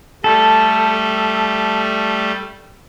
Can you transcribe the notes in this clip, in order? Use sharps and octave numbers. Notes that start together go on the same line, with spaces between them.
G3 A3 A4